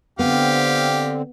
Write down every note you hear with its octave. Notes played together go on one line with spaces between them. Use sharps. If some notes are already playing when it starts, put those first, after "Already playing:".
D3 B3 C4 G4 F5